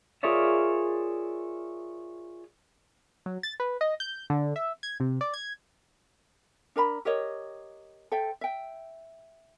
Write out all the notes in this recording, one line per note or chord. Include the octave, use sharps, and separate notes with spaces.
F4 G#4 A#4 C#5 D5 E5
F#3
A6
B4
D#5
G6
D3
E5
G#6
C3
D5
G#6
D4 A#4 A#5 B5
G4 A#4 C#5 D#5
A4 C5 E5 G5
E5 G5